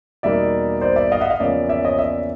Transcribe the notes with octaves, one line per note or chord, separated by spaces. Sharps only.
E2 B2 G3 A#3 D#4 D5 E5
C5 D5
D5 E5
D#5 F5
E5 F#5
D#5 F5
E2 C#3 F3 A#3 C#4 D5 E5
D5 E5
C#5 D#5
D5 E5